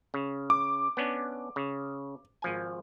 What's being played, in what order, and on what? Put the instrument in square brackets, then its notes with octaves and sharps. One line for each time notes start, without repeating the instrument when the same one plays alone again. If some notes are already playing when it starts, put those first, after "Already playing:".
[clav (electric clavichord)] C#3
[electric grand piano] D6
[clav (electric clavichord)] B3 C#4 D4
C#3
G#1 F3 G#5